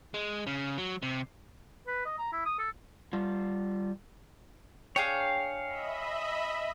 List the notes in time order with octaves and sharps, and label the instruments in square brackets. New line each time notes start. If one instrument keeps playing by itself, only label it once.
[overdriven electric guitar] G#3
C#3
F#3
C3
[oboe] B4
D#5
A#5
E4
D#6
A4
[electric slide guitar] G3 F4
[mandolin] D4 G#4 G5 [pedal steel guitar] C#5 F5
[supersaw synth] D#5 E5 B5